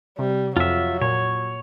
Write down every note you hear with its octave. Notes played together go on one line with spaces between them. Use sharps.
C3 G3
F2 F#3 F4 E5
A#2 C#5